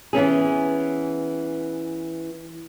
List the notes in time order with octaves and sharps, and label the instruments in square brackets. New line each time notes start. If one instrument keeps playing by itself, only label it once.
[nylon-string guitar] E3 B3 C#4 G#4